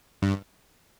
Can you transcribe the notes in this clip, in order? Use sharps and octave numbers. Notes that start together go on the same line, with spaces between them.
G2